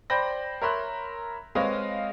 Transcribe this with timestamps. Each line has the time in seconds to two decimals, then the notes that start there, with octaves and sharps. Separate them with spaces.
0.10 C5 D5 G5 B5 G6 A#6
0.62 A#4 C#5 E5 B5 C6 F#6
1.55 G#3 C4 B4 C#5 D#5 F5